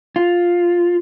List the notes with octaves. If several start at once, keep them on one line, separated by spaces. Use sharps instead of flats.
F4